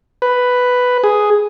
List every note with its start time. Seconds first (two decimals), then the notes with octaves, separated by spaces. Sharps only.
0.22 B4
1.04 G#4